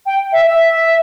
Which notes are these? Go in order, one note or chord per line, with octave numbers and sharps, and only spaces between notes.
G5
E5
E5